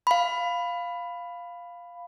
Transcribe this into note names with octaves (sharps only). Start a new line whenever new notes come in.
F5 B5